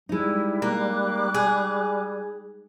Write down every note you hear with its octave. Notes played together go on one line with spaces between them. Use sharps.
G3 G#3 D#4 E4
A#3 D6 F#6
G#4